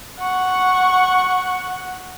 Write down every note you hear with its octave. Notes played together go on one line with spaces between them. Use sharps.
F#5 C#6